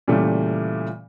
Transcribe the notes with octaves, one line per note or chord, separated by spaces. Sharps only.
A#2 C#3 E3 G3 A3